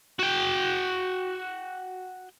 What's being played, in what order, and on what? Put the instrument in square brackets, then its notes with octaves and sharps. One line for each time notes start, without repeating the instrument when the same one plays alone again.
[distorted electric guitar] F#4 G5